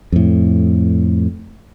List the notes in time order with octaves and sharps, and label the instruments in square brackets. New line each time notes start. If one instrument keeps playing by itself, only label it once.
[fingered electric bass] F2 A2